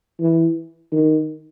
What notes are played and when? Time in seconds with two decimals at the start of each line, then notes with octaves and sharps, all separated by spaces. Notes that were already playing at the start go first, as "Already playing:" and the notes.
0.20 E3
0.92 D#3